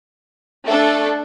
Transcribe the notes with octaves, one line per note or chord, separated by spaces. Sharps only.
A3 D4 A4